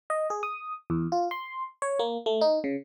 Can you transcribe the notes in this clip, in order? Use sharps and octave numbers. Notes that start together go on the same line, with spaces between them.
D#5
G#4
D#6
E2
F4
C6
C#5
A#3
A3
D#4
C#3